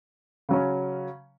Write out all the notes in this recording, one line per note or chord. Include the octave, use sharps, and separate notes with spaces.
C#3 F#3 C#4